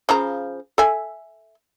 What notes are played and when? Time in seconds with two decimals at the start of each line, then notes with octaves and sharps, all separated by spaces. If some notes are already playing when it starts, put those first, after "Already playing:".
0.09 C#3 F3 A#5
0.78 A4 E5 G#5